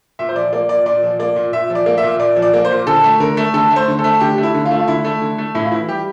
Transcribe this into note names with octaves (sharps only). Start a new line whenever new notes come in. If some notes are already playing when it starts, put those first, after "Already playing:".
A#2 E5
C5
F3 D5
A#3 D5
A#2 D5
A#2 D5
F3
A#3 D5
A#2
A#2 E5
F3
D5
A#3
E5
A#2
A#2 D5
F3
D5
A#3
C5
A#2
D3 A4
A3
D3 A#4
A3
D3 A4
A3
C5
D3
A4
A3
D3 G4
A3
E4
D3
F4
A3
F4
D3 E4
A3
D3
A3
A2 E4
F4
E3 E4
G3 G4